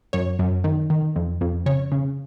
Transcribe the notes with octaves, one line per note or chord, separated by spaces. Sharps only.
F#2 C#5
F#2
D#3
D#3
F2
F2
C#3 C#5
C#3